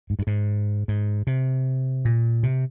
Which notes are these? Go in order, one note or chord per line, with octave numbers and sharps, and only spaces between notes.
G#2
G2
G#2
G#2
C3
A#2
C3